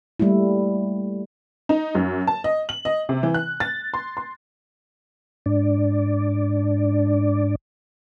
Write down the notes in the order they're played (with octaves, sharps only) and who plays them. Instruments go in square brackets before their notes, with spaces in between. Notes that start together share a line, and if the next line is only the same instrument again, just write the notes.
[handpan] G3 A3 A#3 E4
[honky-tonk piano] D#4
F#2
A5
D#5
F#7
D#5
C3
E3
F#6
A6
C6
C6
[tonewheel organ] G#2 D4 D5